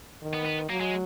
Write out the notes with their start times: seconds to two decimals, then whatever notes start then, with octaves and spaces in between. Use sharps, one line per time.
0.22 D#3
0.34 B3
0.45 B3
0.70 F#3 A#3
0.81 G#3